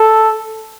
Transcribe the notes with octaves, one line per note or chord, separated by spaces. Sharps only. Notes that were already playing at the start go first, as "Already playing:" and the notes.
Already playing: A4